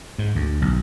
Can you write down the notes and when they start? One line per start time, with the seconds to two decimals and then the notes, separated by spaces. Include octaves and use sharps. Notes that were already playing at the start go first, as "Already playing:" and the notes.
0.18 G#2
0.35 D2
0.62 B1